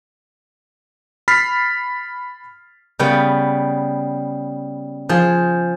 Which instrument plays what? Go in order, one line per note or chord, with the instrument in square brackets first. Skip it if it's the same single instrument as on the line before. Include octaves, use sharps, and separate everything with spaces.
[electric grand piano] B5 F6 A6 B6 C7
[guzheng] C#3 G3 B3
F3 G#4